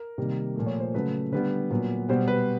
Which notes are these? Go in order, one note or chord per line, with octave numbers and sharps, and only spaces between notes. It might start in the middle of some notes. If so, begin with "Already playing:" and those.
Already playing: A#4
C3 D#3 G3 A#3
A#2 F3 A3
C#5
C5
C#3 F#3 A3 B4
D3 G3 B3 B4
A#2 F#3 B3
B2 G3 B3 C5
B4